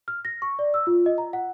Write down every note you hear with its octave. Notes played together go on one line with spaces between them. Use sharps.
F6
A#6
C#6
D5
E6
F4
D#5
A#5
F#5